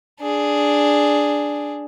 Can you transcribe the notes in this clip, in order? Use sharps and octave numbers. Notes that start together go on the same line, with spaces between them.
D4 G#4